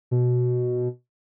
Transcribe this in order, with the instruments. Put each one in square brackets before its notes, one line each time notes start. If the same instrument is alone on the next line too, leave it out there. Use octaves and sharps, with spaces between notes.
[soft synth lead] B2